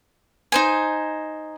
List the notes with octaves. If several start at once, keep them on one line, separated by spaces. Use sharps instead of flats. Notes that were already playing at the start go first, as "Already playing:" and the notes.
D#4 C5 G#5